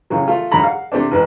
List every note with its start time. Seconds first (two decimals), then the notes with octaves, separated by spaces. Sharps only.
0.10 A2 C#3 F#3
0.28 A3 F4
0.51 G#2 D3 F#3 A3 A#5 B5
0.63 F5 F#5
0.92 C3 A3 C4 D4
1.11 A1 G#2 B4